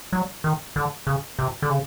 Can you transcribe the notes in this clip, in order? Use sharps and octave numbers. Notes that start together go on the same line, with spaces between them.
F#3
D#3
D3
C#3
C3
D3
C#3